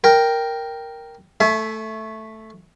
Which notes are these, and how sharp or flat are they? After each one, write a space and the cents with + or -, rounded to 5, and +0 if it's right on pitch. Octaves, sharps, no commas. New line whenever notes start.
A#4 +0 G5 +0
A3 +0 E5 +0 G#5 +45